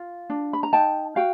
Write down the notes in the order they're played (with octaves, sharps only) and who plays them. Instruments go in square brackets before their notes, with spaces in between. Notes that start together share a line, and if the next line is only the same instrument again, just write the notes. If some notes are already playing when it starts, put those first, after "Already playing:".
Already playing: [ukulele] F4
D4
B5
A#5
D#4 G5 A5
F#4 F5 G5